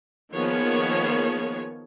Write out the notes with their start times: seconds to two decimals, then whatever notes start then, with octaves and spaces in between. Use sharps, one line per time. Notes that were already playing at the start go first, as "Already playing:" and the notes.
0.34 D#3 F3 A#3 B3 G#4 C#5